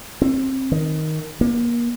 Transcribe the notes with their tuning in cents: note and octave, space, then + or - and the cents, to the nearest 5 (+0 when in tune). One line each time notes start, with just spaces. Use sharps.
C4 +25
D#3 +5
A#3 +30